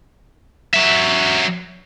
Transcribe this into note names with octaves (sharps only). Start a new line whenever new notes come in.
F#3 E5